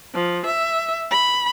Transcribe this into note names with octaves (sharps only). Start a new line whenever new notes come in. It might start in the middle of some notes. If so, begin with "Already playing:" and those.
F3
E5
B5